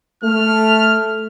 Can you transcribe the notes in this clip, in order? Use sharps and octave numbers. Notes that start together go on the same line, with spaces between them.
A3 F6